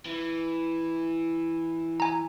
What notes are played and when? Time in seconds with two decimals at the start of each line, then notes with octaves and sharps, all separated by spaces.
0.06 E3
2.00 G#5 A#5